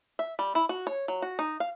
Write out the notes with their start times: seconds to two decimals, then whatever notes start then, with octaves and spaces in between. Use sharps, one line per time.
0.19 E5
0.39 G3
0.55 E4
0.69 F#4
0.87 C#5
1.08 F#3
1.22 F#4
1.39 D#4
1.60 F5